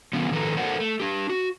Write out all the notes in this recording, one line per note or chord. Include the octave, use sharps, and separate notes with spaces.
D3 E3 B3 C#4
D#3 F3 A4 B4 A#5
A4 A#4 C5 D5 F#5
A3
D4 G4
F#4